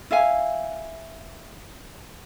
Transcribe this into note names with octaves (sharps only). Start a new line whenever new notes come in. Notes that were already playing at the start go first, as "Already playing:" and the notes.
E4 E5 F5 G#5